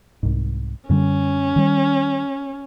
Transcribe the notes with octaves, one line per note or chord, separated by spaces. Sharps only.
C2 G#2
F#2 D3 G3 C#4
D#3 G3